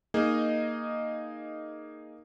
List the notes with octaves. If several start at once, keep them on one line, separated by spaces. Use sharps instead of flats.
A#3 D#4 G#4 D#5